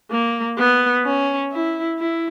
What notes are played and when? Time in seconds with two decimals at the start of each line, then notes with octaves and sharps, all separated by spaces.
0.11 A#3
0.58 B3
1.04 C#4
1.51 E4
1.98 E4